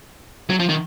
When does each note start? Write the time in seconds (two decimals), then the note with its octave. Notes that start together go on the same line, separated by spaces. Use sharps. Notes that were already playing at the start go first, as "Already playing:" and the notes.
0.50 F#3
0.60 F3
0.69 D#3